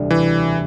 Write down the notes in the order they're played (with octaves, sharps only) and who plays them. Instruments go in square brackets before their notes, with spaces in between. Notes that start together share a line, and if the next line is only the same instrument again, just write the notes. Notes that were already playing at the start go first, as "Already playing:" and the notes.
Already playing: [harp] E1 D2 C3 G3
[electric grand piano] E3